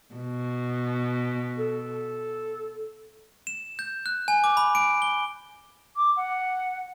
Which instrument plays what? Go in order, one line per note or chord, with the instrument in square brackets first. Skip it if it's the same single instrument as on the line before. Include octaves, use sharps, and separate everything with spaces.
[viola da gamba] B2
[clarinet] A4
[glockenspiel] E7
G6
F#6
G#5
D6
B5
D7
G7
[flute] D6
F#5